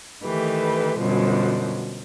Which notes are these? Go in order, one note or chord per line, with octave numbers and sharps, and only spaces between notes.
D#3 E3 A3 G4 B4
F#2 B2 D3 F3 G3